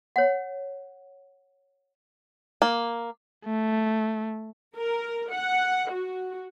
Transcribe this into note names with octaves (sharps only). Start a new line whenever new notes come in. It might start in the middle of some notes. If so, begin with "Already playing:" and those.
C#5 F#5
A#3
A3
A#4
F#5
F#4